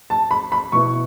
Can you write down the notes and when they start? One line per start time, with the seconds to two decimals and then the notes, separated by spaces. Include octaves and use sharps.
0.10 A5
0.31 B5
0.52 B5
0.72 B2 B3 E4 C#6